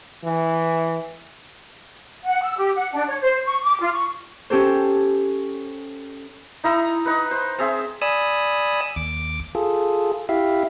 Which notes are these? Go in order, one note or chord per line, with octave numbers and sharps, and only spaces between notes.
E3
F#5
E6
G4
F#5
D4
C#5
C5
C#6
D6
F4
C#6
C#4 G4 A4 C5
D#4 E4 A#5 D#6
D#4 B4
C5
C4 G#4 E5
D5 G#5 B5 D#6 E6
D#2 D6
F4 G#4 A4
E4 G4 E5 F5